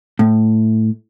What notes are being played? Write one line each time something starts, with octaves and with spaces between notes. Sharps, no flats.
A2